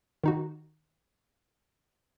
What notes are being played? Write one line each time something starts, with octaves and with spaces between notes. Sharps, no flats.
D#3 D#4 F#4